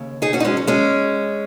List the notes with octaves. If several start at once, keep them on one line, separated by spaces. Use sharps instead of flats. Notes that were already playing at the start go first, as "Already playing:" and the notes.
Already playing: D#2 C#3
D#4 G#4
C#4 F#4
D#4
G#3 C#4
F#3
G#3 C#4